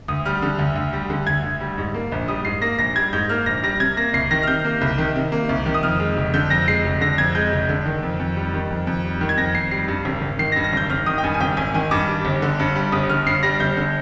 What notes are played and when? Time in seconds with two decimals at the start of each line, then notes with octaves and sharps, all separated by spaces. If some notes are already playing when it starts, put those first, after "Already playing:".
0.08 D2 D#6
0.26 G3 F6
0.42 D3
0.59 D2
0.76 D2
0.93 G3
1.10 D3
1.26 D2 G#6
1.43 D2
1.61 G3
1.78 G#2
1.94 A#3
2.12 A#1
2.28 G3 D#6
2.45 G#2 C7
2.62 A#3 A#6
2.79 A#1 A#6
2.96 G3 G#6
3.13 G#2 G6
3.29 A#3 F6
3.46 A#1 A#6
3.63 G3 A#6
3.80 C3 G#6
3.97 A#3 A#6
4.13 C2 C7
4.31 D#3 A#6
4.43 F6
4.47 C3 G6
4.64 A#3
4.81 C2
4.98 D#3
5.16 C3
5.32 A#3
5.49 C2
5.66 D#3
5.74 D#6
5.83 F2 F6
6.00 G#3
6.17 F1
6.34 D3 G6
6.50 F2 A#6
6.68 G#3 C7
6.85 F1
7.01 D3 A#6
7.18 F2 G#6
7.35 G#3 G6
7.52 F1
7.69 D3
7.86 D#3
8.03 F2
8.19 F2
8.36 G3
8.53 D#3
8.70 F2
8.87 F2
9.04 G3
9.21 D#3
9.29 G#6
9.38 F2 A#6
9.54 F2 C7
9.71 G3 C7
9.88 G2
10.05 G#1
10.22 G#1
10.39 D#3 C7
10.52 A#6
10.56 G2
10.64 A#6
10.73 G#1 G6
10.90 G#1 F6
11.06 D#3 D#6
11.18 G5
11.23 G2 G#5
11.34 G#5
11.40 G#1 G5
11.57 G#1 G#5
11.74 D#3 G#5
11.91 G2 D6
12.08 G3
12.25 G1
12.42 D3
12.59 G2
12.76 G3
12.92 G1 D#6
13.09 D3 F6
13.26 G2 C7
13.43 G3 A#6
13.60 G1 G6
13.77 D3